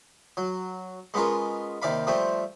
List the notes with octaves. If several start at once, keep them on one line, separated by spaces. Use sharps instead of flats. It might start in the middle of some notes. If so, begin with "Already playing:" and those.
F#3
G#3 B3 C#4 F4 A#4
D#2 C3 D5 F5 B5
F3 G3 A3 C4